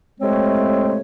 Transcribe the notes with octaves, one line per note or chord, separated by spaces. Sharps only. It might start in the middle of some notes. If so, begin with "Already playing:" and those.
A2 C3 G#3 A3 C4 C#5